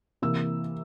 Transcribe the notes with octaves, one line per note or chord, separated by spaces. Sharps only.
C3 E3 A#3 E6